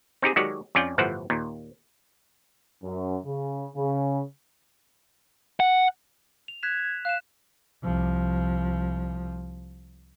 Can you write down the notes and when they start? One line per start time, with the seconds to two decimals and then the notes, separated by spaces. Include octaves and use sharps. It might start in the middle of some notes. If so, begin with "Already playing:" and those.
0.22 C4 D#4 G4 G#4
0.36 D#3 F#3 G#3 F#4 G4 D5
0.75 F2 C#4 F4 D5 G5
0.98 G1 A2 E3 F3 C5 F#5
1.30 D#2 A#2
2.83 F#2
3.25 C#3
3.76 C#3
5.60 F#5
6.48 F7
6.63 F#6 G#6 B6 E7
7.05 F5 F#6 E7
7.84 C2 F3